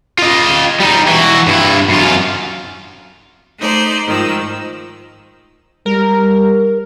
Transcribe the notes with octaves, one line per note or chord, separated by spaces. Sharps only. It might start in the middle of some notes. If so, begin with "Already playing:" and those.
F4 D#5
G3 D#4
E3 F#4
G2 E4
F#2 F4
A3 D#4 C5 D5
G#2 D#3 F3 E6
G3 A#4